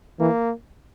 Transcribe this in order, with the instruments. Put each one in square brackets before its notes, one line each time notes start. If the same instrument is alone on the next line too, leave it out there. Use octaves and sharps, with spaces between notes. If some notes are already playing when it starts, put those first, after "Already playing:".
[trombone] E3 [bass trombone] A#3